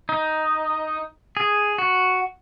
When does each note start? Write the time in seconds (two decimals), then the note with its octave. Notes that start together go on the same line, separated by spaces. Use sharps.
0.09 D#4
1.37 G#4
1.78 F#4